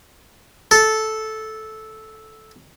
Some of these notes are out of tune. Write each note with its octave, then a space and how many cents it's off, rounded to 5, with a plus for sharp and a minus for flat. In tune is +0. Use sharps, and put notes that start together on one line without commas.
A4 -10